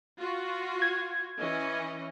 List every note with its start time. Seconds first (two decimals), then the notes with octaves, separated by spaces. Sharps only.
0.18 F4 F#4
0.82 G#6
1.39 E3 C#4 D#5